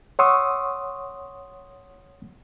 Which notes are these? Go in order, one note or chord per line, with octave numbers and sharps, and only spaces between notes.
C#5 F#5 C6 C#6 D#6 E6